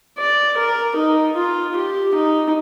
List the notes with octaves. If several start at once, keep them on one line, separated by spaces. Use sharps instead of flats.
D5
A#4
D#4
F4
G4
D#4